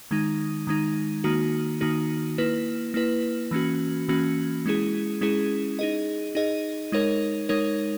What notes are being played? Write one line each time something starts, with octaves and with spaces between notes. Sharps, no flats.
D#3 G#3 D#4
D#3 G#3 D#4
D#3 A#3 D#4 F#4
D#3 A#3 D#4 F#4
A#3 E4 B4
A#3 E4 B4
E3 A#3 C#4 F#4
E3 A#3 C#4 F#4
G#3 C#4 E4 G#4
G#3 C#4 E4 G#4
D#4 G#4 D#5
D#4 G#4 D#5
G#3 D#4 A#4 C#5
G#3 D#4 A#4 C#5